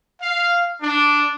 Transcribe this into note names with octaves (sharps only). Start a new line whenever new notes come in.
F5
D4